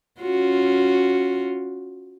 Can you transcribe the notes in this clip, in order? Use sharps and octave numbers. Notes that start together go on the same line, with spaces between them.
C#4 F4 F#4